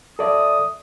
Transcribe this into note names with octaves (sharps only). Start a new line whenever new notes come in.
A4 D5 E5 D#6